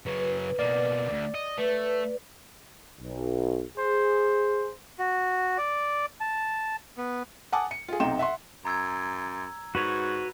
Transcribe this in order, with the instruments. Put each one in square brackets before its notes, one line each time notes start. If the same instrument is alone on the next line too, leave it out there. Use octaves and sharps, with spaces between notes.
[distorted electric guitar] C#3 F#3 [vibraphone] B4
[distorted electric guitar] B2 A#3 [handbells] D5
[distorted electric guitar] D2
D#5
[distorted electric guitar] A3 [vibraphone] B4
[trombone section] B1
[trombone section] G#4 [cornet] C5
[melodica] F#4
D5
A5
B3
[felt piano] F#5 G#5 A5 D6 D#6
C#7
F4 G#4
B1 C3 D#4 G5 C6 E7
E5 F#5 C6
[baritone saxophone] F#2 [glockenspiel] A#5 E6 G#6
[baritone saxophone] G#2 [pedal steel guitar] F#4 B4 C#5